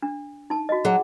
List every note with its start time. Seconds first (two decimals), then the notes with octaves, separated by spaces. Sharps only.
0.02 D4
0.50 D#4 A5
0.69 F#4 D#5
0.85 F#3 G#4